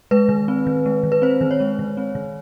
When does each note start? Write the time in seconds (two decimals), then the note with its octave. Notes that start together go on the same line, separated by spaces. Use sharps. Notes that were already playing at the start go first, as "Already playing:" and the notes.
0.11 G#3 B4
0.29 D#3
0.48 C4
0.67 D#3
0.86 G#3
1.03 D#3
1.12 B4
1.22 C4 C5
1.41 D#3
1.51 C#5
1.60 G#3
1.79 D#3
1.97 C4
2.15 D#3